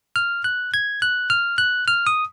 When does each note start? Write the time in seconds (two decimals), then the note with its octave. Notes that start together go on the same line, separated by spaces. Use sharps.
0.16 F6
0.44 F#6
0.74 G#6
1.02 F#6
1.30 F6
1.58 F#6
1.88 F6
2.07 D#6